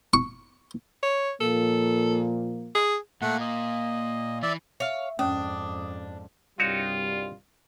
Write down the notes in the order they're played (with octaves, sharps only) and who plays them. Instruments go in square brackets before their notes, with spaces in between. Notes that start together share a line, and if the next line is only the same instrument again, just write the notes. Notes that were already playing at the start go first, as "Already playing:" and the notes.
[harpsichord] C#6
[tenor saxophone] C#5
[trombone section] A#2 F3 A#3 [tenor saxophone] A4
[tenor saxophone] G#4
[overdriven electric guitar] A#2 [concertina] A3 F#5
[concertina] D#5
[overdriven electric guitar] E3 [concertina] D5 E5
[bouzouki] C#5 F5 [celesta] E5
[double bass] F2 G#2 [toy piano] C#4 [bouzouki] D4 [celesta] D#6
[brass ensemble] C2 G2 G3 [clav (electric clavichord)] D#4 F#4 C#5 [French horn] F4